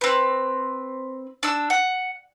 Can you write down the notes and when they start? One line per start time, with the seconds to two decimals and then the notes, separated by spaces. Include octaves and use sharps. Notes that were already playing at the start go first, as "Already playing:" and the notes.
0.01 C4 B4
1.43 D4 E6
1.70 F#5